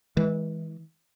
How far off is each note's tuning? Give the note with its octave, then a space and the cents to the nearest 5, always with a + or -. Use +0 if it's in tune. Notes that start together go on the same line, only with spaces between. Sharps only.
E3 -30 G#3 +0